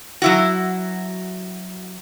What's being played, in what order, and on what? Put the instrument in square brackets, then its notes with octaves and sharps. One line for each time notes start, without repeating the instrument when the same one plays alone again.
[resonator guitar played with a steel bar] F#3 E4 F#4